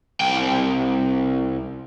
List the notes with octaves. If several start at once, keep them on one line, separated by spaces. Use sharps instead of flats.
C2 G5